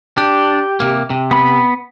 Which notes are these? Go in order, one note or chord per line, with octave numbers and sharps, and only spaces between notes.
D4 G4
C3 A#3
C3
B3 B5